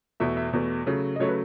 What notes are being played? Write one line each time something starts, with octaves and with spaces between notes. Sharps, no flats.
E2 B2 A3 E5
E5
E2 B2 A3
C#3 F#3 A3
D#5
C#3 F#3 A3 C#5
B4